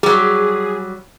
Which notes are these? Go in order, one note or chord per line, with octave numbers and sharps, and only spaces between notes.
F#3 G3 G#4